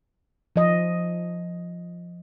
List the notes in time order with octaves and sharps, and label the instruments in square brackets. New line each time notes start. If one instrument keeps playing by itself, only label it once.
[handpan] F3 D#5